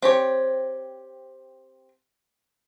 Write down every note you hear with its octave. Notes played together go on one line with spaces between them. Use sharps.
C4 G4 C#5